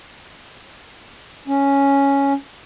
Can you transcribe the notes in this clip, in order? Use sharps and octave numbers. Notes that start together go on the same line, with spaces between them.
C#4